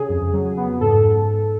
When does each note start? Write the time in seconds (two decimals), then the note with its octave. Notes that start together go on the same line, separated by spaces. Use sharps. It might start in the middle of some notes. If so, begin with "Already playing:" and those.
Already playing: C#3 G#4
0.09 F2
0.33 F#3
0.57 B3
0.81 G#2 A4